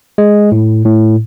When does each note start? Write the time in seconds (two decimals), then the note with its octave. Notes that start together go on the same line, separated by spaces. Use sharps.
0.18 G#3
0.52 A2
0.86 A2